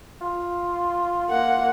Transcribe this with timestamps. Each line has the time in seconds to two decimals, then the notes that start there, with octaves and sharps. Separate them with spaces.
0.21 F4
1.30 A#3 F#5